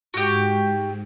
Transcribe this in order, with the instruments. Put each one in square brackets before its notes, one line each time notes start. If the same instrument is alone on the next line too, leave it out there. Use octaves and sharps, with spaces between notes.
[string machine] G#2 [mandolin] F#4 G4